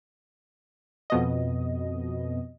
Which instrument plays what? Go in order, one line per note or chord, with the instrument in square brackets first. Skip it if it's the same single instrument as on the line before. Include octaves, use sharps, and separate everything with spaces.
[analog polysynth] F2 B2 D#5